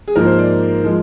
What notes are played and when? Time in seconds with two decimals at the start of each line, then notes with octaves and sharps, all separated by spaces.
0.08 G#4
0.16 G#2 F3 A#3 A#4
0.27 C5
0.39 D5
0.84 F3 G#3